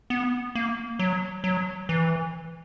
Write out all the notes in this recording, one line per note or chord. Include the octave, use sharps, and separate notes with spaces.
B3
A#3
F#3
F#3
E3